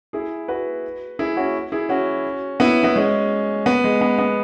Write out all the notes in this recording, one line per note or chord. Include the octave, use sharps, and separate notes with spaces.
E4 G#4
F#4 B4
E4 G#4
C#4 F#4
E4 G#4
C#4 F#4
B3 E4
B3 E4
G#3 C#4
B3
G#3
B3
B3